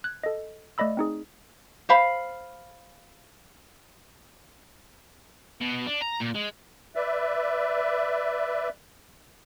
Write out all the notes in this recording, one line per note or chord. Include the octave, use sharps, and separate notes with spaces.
F#6 G#6
A4 D#5
A3 D5 D#5 B5 E6
C4 D#4 G#4
C5 F5 B5
B2
D4
A#5
A#2
G#3
B4 D5 E5